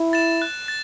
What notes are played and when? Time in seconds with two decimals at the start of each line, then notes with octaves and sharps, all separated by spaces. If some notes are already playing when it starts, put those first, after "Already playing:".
Already playing: E4
0.13 A6 E7
0.42 F#6
0.68 A6